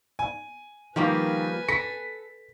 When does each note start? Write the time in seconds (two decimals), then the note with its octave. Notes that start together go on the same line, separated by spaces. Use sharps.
0.19 G#5
0.96 D#3 F3 G3 A#3 B4 G#5
1.68 A4 A#6 B6 C#7